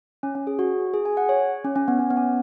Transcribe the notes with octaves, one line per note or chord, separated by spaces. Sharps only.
C#4
C#4
G#4
F#4
G#4
G#5
F#5
C#5
C#4
C#4
B3
C#4
B3
C#4